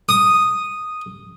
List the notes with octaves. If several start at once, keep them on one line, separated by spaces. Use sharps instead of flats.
D#6